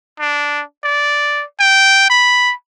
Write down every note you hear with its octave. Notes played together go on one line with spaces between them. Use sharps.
D4
D5
G5
B5